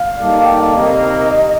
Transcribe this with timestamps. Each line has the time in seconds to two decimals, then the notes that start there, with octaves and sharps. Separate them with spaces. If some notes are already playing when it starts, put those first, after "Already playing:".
Already playing: F5
0.17 G3 A#3 D#4 A4 D5
0.45 G5
0.60 F5
0.74 C3 D#3 G3 A#3 D#5